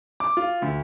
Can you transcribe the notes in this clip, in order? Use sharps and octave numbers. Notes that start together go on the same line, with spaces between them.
D6
F4
D2